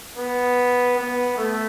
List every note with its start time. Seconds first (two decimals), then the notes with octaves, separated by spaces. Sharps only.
0.17 B3
0.97 B3
1.37 A3